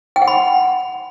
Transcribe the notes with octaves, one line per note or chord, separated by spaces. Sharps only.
G5
F#5
B5